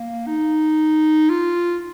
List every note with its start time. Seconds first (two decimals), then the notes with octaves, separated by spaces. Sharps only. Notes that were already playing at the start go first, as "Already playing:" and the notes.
Already playing: A#3
0.27 D#4
1.30 F4